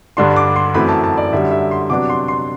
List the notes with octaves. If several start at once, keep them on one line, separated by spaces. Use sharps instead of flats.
G2 D3 G3 D4 C6
D6
C6
F#2 E3 A3 C4 B5
A5
A5
D5
F#2 D3 G3 E5
E5
C6
C3 F#3 B3 D4 D6
C6
C6